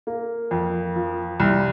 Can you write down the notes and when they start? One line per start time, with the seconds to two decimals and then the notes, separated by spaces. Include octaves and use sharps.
0.07 A#3
0.51 F2
0.96 F3
1.40 C2